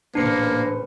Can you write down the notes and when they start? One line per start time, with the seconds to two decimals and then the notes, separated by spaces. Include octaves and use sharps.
0.15 A1 A#2 C#3 A#3 D4 B4 C5 C#7